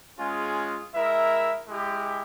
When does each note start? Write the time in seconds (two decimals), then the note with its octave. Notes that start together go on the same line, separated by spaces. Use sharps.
0.19 G#3 C#4 F4 G#4
0.93 G#3 E4 A#4 E5
1.68 G#3 E4 G4